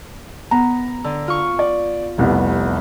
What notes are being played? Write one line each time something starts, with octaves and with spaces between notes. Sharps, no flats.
B3 A#5
D3
F4 C#6
D5
F1 C2 B3